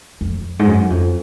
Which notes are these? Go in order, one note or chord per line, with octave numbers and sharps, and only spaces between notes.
F2
G#2
F#2
F2